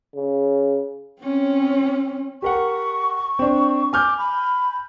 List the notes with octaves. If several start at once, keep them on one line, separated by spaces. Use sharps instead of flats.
C#3
C4 C#4
G4 A#4 F#5 C#6
C4 D4
G#5 D6 F6 G6
B5